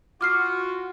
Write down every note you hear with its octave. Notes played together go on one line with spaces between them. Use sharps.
F4 F#4 D6 F6 C7